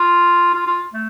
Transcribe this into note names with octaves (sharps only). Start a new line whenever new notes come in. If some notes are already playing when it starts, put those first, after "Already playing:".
Already playing: F4
F4
F4
A3